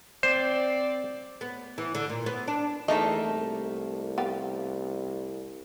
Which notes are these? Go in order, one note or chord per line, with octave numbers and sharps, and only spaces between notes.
C4 C5 D5
B3
E3
D3
A#2
B3
D4
E2 A3 A#3 D#4 D#5 E5 A5
C2
B3 G4 F5